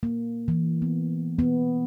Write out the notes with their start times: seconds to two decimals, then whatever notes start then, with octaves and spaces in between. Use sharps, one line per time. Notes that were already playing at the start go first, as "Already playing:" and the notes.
0.03 A#3
0.48 E3
0.82 B3
1.39 B3